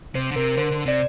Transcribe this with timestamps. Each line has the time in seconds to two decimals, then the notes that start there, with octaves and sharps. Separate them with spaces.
0.15 C3 C5
0.31 D3
0.36 C3 A#4
0.57 D3 C5
0.71 D3
0.86 C3 D5